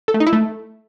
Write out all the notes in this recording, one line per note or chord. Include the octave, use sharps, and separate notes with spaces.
A4
A3
D#4
E4
A3